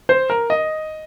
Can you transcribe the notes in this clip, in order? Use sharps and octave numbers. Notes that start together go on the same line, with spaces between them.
C5
A#4
D#5